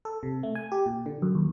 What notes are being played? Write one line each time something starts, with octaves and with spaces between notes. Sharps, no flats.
A4
C3
A3
G#5
G4
A#2
D3
F#2
D#2